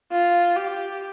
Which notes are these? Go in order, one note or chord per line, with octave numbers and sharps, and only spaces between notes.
F4
G4